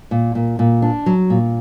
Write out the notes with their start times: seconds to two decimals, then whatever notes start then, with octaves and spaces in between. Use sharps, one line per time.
0.11 A#2
0.35 A#2
0.59 A#2
0.82 D4
1.06 F#3
1.30 A#2